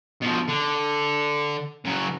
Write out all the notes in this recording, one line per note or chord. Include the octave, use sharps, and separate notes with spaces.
B2 F3
D3
C#3 F#3